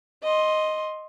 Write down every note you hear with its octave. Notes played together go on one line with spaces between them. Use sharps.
D#5 C6